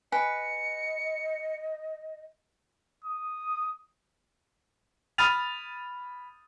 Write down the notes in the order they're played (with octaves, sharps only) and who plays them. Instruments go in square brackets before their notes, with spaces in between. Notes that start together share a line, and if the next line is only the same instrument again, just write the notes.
[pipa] B4 [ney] D#5 [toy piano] G#5 [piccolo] C#7
[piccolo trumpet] D#6
[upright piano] B5 D#6 F6 A6 D#7 F7